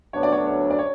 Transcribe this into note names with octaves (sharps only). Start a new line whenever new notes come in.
D2 D3 F#3 B3 D4 C#5
D5
C#5
C#5
D5
C#5